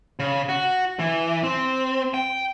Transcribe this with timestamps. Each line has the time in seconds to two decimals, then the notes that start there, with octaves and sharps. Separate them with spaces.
0.19 C#3
0.49 F#4
0.99 E3
1.44 C4
2.14 G5